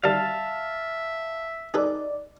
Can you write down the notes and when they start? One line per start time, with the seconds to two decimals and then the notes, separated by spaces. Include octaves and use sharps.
0.04 D#3 G3 E5 F5 A5
1.74 D#4 G#4 A4 B4 D5